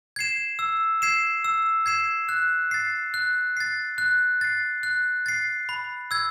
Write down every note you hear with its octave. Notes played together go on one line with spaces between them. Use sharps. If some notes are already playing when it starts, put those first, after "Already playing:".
G#6 C7 E7
E6
G#6 C7 E7
E6
G#6 C7 E7
F#6
A6 C7
F#6
A6 C7
F#6
A6 C7
F#6
A6 C7
B5
E6 G#6